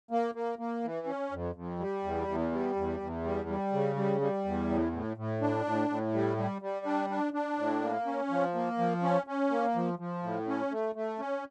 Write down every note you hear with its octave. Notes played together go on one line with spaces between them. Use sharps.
A#3
A#3
A#3
E3
C#4
F2
F2
G3
E2
E2
G3
E2
E2
G3
G3
C#3
G3
G3
E2
A2
A2
A2
D4
A2
A2
G3
G3
G3
D4
D4
D4
A2
A#3
C#4
F3
A#3
F3
C#4
C#4
A#3
F3
F3
A2
C#4
A3
A3
C#4